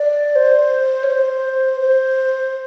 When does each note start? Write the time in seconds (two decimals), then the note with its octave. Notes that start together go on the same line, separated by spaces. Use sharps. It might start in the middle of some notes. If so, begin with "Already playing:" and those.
Already playing: D5
0.35 C5
1.03 C#5
1.08 C5
1.81 C5